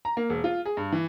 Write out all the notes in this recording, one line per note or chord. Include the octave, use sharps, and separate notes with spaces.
A#5
A#3
E1
F4
G#4
G2
E3